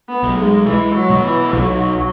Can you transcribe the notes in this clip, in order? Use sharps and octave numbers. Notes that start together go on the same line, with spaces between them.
B3
B1
G#3
E3 G#3
F#3
B2
E3
B1 F#3